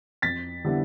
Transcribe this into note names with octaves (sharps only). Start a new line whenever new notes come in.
F2 A6 B6
D3 G3 B3 E4